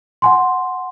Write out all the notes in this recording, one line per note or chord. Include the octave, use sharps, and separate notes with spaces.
F#5 G#5 C6